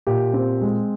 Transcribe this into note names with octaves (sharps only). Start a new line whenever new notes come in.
A#2 G4
C4
G#3